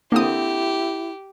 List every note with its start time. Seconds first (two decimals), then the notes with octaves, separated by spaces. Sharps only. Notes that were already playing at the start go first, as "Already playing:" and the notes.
0.12 D3 A#3 C4 E4 G4 D#6